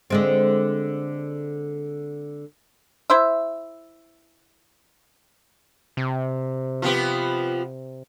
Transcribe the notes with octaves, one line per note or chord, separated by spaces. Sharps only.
D3 G#3 C4
E4 C5 E5
C3
F3 B3 G4